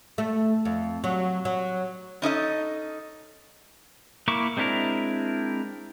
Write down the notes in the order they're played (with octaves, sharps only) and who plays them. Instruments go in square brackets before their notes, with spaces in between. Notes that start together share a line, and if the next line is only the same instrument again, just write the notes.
[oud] A3
F2
F#3
F#3
[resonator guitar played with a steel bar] C#4 D#4 A4 D#5
[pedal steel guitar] A#3 E4 A#5 C#6 D6
G#3 C4 D4 E4 A#4